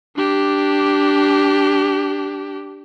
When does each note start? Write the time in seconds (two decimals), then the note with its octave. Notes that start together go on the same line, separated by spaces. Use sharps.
0.16 D4 G4